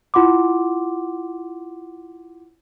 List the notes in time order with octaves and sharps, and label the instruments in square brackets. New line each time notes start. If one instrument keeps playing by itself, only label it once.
[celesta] E4 F4 F#5 C6 D6